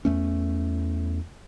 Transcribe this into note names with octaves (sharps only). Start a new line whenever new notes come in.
E2 A3 C#4